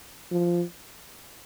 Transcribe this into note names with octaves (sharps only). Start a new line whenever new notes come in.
F3